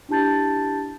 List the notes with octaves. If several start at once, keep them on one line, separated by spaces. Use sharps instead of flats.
D4 E4 G4 A5 G6 A6